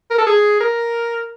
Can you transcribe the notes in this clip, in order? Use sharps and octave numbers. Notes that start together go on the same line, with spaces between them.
A#4
A4
G#4
A#4